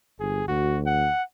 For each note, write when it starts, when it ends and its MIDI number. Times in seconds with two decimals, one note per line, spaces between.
0.20 0.43 31
0.20 0.43 68
0.48 1.09 38
0.48 0.79 66
0.86 1.23 78